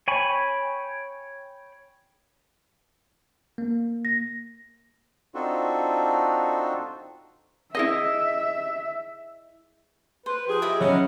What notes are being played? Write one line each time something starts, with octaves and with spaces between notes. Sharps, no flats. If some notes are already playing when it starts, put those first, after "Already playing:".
C#5 G5 G#5 B5 C#6
A#3
A#6
C4 D4 D#4 F4 F#4 A4
E4 G#4 D#5 E5
B4 C5
F3 G4 G#4
E4 D#5 E5
F#3 B3 C#4 D#4